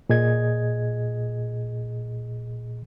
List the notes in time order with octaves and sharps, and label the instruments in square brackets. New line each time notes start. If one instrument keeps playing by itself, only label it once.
[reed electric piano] A#2 G#4 D#5 G#6